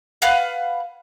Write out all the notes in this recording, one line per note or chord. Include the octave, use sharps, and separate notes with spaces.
B4 F5 F#5